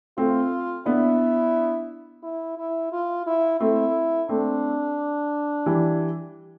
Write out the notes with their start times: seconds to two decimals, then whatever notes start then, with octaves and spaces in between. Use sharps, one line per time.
0.18 A3 C4 F4
0.86 B3 D4 E4
2.23 E4
2.58 E4
2.92 F4
3.26 E4
3.60 A3 C4 E4
4.29 A3 C4 D4
5.66 E3 G3